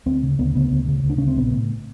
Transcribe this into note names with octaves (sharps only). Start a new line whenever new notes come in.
D2 C4
C#3
D2 B3
C#3 B3
D2
C#3
D2
D4
C#3 C#4
C4
A#1 B3
A2